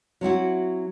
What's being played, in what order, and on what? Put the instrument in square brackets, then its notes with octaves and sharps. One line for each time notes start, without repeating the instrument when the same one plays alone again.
[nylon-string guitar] F#3 C4 E4 F#4